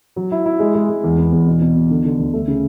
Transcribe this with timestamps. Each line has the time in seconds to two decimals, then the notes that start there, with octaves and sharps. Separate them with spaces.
0.16 F#3
0.31 E4
0.46 E4
0.60 G#3
0.75 G#3
0.89 G#3
1.04 E2
1.18 B3
1.32 E2
1.47 B2
1.61 B2
1.76 B2
1.90 D3
2.04 D3
2.19 D2
2.33 A3
2.48 C#3